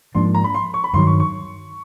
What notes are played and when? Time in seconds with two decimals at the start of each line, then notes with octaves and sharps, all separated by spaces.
0.15 G#2 F3 A#3 D4 C6
0.35 A#5
0.44 B5
0.54 C6
0.74 C#6
0.84 B5
0.93 G2 D#3 F#3 C6
1.07 C#6
1.20 C#6